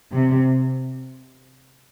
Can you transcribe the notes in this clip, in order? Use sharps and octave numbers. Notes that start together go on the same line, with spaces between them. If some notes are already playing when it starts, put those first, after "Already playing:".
C3